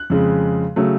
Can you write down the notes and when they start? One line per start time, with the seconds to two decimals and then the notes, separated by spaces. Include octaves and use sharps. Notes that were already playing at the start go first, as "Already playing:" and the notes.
Already playing: F#6
0.10 F2 C#3 G#3
0.76 C#3 F#3 A3